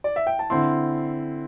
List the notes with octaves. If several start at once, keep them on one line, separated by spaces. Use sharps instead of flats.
D5
E5
G5
A5
D3 C4 E4 C6